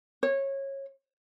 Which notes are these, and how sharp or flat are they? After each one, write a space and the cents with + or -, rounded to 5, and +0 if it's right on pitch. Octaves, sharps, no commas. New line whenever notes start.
C#5 -20